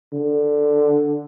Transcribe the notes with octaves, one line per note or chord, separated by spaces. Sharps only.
D3